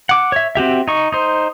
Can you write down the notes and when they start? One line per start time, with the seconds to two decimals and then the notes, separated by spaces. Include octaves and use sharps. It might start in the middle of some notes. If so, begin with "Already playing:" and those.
0.09 F#5 D6
0.32 C#5 E5
0.55 C4 F#4 G4 E5
0.88 D#4 C#6
1.12 D#4 C5